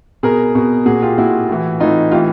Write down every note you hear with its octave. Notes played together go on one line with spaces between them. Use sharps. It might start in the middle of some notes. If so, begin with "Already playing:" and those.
B2 G#4 A#4
B2
A#2 F#4 G#4
F4 G4
A#2 E4 F#4
A2 E3
A2 E3 D#4 F4
A2 E3 F4 G4